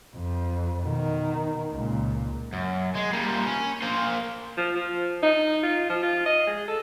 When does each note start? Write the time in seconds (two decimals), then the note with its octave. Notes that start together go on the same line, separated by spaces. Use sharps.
0.16 F2
0.85 B2 D#3
1.72 C#2 A#2
2.53 F#2
2.96 G#3
3.13 A#2 G3
3.47 C#4
3.82 A#3 C5
4.57 F3
4.74 F3
5.22 D#4
5.63 F4
5.90 F3
6.02 F4
6.26 D#5
6.47 G#3
6.68 A4